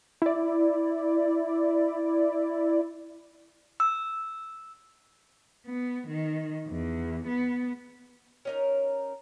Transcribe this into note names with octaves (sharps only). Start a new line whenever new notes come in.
E4 D5
E6
B3
D#3
E2
B3
C#4 D#4 A#4